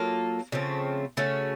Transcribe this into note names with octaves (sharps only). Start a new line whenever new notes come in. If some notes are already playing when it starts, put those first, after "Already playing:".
Already playing: F#3 A#3 F4 A4
C#3 F3 A3 C4
C#3 A3 C#4 F#4